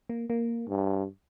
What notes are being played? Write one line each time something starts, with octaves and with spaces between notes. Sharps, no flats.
A#3
A#3
G2